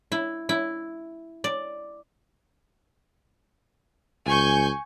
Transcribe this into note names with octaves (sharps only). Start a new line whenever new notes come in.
E4
E4
D5
C#2 G#5 C#6 G6